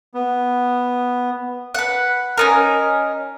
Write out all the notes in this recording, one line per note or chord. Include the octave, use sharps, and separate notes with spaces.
B3
B4 F#5
C#4 D#4 A#4